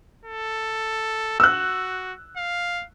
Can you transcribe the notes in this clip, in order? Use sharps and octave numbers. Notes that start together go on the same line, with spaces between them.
A4
F#4 E6 F#6
F5